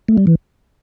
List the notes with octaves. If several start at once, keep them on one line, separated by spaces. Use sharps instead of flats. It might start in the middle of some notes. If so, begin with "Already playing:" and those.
A3
G3
E3